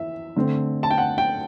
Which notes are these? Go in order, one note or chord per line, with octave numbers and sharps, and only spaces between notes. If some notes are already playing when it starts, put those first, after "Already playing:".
Already playing: E3 E5
D3 A3 C4
A5
G5
F#5
G5